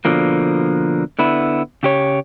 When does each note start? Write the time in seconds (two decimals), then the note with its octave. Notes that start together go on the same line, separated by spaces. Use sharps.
0.05 B2 D3 F3 A#3
1.19 D3 B3 E4
1.83 C#3 G4 C#5